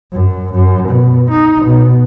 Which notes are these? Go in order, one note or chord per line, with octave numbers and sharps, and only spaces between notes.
F#2
F#2
B2
D#4
B2